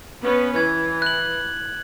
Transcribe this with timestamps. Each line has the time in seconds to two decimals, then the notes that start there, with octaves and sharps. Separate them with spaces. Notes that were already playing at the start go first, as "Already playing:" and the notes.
0.22 B3 C#4 B4
0.56 E3 G#6
1.02 F#6 F#7